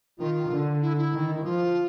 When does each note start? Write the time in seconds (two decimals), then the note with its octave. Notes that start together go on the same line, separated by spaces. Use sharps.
0.19 D#3 F4
0.51 D3
0.82 E4
0.98 E4
1.13 D#3
1.35 E4
1.45 F3 F4